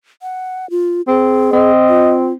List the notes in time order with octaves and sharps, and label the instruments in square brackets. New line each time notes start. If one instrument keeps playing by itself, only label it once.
[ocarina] F#5
F4
[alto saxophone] C4 [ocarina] G#4
[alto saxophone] C4 [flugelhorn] D#5
[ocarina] F4